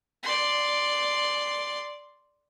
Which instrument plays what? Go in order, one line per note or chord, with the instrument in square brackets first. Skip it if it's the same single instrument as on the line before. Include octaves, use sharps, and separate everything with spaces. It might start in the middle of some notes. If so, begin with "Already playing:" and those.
[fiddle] D5 C6